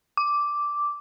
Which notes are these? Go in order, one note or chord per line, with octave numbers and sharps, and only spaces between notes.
D6